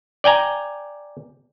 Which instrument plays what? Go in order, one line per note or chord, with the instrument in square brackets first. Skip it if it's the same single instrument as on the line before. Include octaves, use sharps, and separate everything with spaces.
[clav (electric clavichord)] D5 G5 G#5 A#5